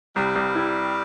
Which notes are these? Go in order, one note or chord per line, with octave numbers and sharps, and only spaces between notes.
C2 G3
C2
E4